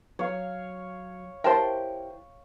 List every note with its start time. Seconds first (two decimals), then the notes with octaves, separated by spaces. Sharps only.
0.19 F#3 C#5 F5
1.44 E4 G4 A#4 C5 G5 A5 C6